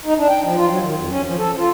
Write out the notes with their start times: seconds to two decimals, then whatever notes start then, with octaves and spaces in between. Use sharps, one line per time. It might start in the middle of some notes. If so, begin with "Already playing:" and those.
0.05 D#4
0.17 D4
0.29 G5
0.44 F3
0.56 F4
0.69 F#3
0.82 D#3
0.97 F2
1.10 C#4
1.25 F3
1.38 A4
1.57 F4